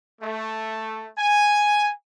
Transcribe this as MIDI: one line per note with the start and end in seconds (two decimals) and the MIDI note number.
0.22 1.10 57
1.18 1.90 80